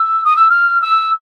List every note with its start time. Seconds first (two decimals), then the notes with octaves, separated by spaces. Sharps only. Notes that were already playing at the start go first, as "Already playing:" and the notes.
Already playing: E6
0.24 D#6
0.36 E6
0.49 F6
0.81 E6